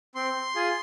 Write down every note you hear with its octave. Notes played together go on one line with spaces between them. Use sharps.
C4 C6
F4 G#4